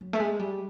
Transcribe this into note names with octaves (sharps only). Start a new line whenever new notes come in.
F#3
A3
G#3
G3